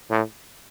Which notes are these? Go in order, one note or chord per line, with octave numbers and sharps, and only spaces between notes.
A2